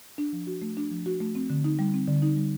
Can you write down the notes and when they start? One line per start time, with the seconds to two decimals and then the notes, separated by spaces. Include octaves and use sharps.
0.18 D4
0.33 F3
0.47 F#4
0.62 A3
0.77 D4
0.91 F3
1.06 F#4
1.20 A3
1.35 C4
1.50 D3
1.64 D#4
1.79 G3
1.94 C4
2.08 D3
2.22 D#4
2.37 G3